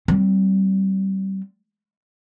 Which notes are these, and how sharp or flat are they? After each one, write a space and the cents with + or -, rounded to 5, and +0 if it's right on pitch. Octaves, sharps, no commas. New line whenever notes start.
G3 -30 C4 +0